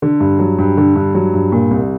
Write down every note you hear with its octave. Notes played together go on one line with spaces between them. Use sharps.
D3
G2
F#3
G2
D3
G2
F#3
G2
A#2
C2